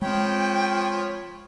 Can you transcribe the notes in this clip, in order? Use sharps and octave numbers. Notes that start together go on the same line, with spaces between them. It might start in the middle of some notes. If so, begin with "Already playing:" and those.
F3 G#3 C4 C#5 G5 B5